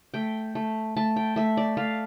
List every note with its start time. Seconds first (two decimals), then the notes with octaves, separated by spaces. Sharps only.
0.14 A3 G5
0.55 A3
0.96 A3 A5
1.16 G5
1.36 A3 E5
1.57 D5
1.77 A3 F5